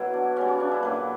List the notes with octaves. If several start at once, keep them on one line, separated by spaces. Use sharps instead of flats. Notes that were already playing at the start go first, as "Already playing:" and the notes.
Already playing: B2 F#3 E4 F#4
D4
C#3 G3 C#4
C#4
D4
E4
A#2 F#3 B4